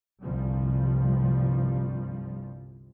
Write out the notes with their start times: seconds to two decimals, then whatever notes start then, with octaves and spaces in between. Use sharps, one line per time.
0.24 G1 C2 F3 G3